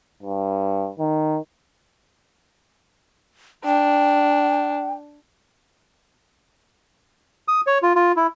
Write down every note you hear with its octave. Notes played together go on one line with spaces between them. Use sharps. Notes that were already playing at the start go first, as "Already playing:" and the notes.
G2
D#3
D4 G5
D#6
C#5
F4
F4
E4